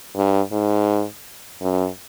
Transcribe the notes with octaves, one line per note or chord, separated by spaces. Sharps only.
G2
G#2
F#2